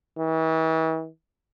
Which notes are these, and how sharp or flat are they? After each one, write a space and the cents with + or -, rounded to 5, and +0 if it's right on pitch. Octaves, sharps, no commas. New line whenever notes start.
E3 -40